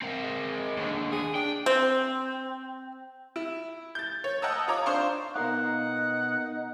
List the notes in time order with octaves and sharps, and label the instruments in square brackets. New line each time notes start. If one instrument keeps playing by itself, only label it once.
[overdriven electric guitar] C4 A#4
[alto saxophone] G#3
[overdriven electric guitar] D#2 D3
[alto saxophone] G#4
[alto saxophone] D4 [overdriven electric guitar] G5
[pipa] C4
[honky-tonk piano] E4
G6 A6
C#5
D#5 F#5 A5 A#5 D#6 E6
F4 C#5 A#5 D6 D#6
D4 C5 F5 C6 C#6
[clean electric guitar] B2 A#4 F5 [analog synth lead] D#4 [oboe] F#5